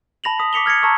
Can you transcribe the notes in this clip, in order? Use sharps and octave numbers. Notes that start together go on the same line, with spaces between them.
A5 B5 A#6 F7 F#7
B5 D#6 B6
D6 B6 C#7 F7 G7
F6 G#6 A#6 C#7
A5 A#5 C#6 E6